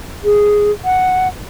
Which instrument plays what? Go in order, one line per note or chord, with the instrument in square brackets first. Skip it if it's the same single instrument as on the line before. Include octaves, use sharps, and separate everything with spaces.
[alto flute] G#4
F#5